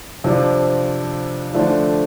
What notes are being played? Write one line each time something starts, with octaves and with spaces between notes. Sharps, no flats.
F2 C3 F3 D4
D3 F3 A3 D4